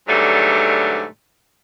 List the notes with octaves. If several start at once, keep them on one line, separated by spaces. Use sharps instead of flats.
G#2 B2 D3 F#3 G3 A3